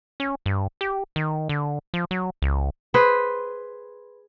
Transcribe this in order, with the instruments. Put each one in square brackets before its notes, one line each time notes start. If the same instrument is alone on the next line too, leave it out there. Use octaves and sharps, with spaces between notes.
[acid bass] C#4
G2
G4
D#3
D3
F3
F#3
C#2
[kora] G#4 B4 C5